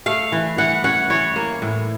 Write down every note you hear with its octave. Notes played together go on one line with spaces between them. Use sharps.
A3 F5
E3
E3 F#5
C#4 F#5
E3 C#5
A#3
A2